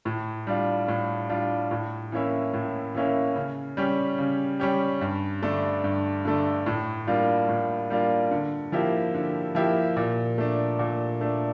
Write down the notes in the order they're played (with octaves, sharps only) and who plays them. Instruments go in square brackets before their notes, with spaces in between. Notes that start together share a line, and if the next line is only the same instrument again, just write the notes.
[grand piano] A2
G3 D4 F4
A2
G3 D4 F4
A2
E3 A#3 C#4 E4
A2
E3 A#3 C#4 E4
C#3
G3 C#4 G4
C#3
G3 C#4 G4
G2
D3 A3 D4
G2
D3 A3 D4
A2
G3 A#3 D4 F4
A2
G3 A#3 D4 F4
D3
F3 A#3 E4 G4
D3
F3 A#3 E4 G4
A#2
A3 D4
A#2
A3 D4